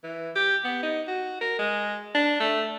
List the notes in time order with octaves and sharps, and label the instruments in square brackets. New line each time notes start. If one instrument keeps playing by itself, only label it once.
[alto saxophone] E3
G4
B3
D#4
F#4
A#4
G#3
D4
A3